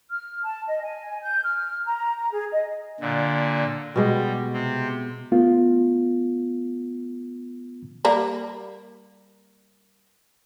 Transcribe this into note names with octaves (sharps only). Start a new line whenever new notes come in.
F6
A5
D#5
G#5
G6
F6
A#5
A#5
G#4
D#5
A#2 D3
B2 G3 G#3
C3 C4
A3 B3 F4
G3 A#3 B5